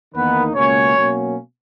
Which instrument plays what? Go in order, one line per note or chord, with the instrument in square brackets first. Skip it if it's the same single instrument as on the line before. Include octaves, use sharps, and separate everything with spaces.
[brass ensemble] E2 D#3 A#3 B3 D#4 B4
C#2 B2 A#3 C#4 C#5
B2 F#3 A#3 C#4